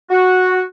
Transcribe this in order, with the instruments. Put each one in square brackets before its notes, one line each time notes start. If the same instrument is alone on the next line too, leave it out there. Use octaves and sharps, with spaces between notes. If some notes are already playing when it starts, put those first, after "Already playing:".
[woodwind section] F#4